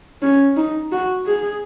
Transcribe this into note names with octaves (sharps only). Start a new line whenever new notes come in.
C#4
D#4
F#4
G#4